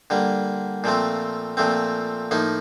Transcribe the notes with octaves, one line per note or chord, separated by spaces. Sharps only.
D3 G3 A#3
A#2 F3 A3 C4
A#2 F3 A3 C4
A2 F3 A#3 D#4